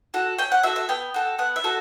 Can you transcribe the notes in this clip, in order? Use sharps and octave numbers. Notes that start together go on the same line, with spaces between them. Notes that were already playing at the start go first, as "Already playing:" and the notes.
F#4 A4
C#4 G5
F#5
F#4 A4 E5
E5
B3 G5
F#4 A4
B3 F#5
E5
F#4 A4